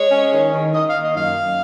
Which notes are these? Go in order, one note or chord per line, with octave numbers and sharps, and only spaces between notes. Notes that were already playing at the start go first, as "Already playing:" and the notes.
Already playing: G#3 C#5
C#4
D#3
D#3
D#3 D#5
F5
A#3
D#5
F#2 F5
F#2